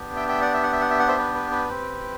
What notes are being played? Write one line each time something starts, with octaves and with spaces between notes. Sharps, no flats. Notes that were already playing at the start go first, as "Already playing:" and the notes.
Already playing: B3 D4 G4
E5 G5
E5 G5
D5 F#5
E5
F#5
E5
F#5
E5
F#5
C5 E5
B4
B4
B4
C4 G4